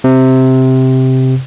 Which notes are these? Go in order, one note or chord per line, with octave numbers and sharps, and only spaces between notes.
C3